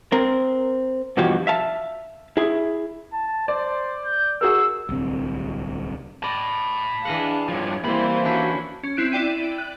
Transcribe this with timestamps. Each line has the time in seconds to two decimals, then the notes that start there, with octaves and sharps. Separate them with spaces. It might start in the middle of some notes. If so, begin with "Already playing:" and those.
0.12 C4 A#4
1.17 G2 B2 E3 F3 F#4 G4
1.47 E5 F5 A5
2.37 E4 G#4
3.13 A5
3.48 C5 D5
4.05 G6
4.41 F#4 G#4 A#4 E6
4.89 D1 C2 C4
6.23 D5 D#5 A5 B5
7.05 E3 D4 G#4 D#5 F5 F#5
7.49 G2 F3 C#5
7.84 C3 E3 G3 A#3 E4 C5 B5
8.25 C#4 D4 E4 F#4 G5
8.83 C#4
8.97 C4 E4 F#6 D7
9.12 E4 D5 G5 D#7
9.58 F#6